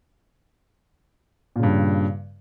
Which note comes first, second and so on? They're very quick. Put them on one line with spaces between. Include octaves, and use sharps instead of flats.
A#2 C#3 G2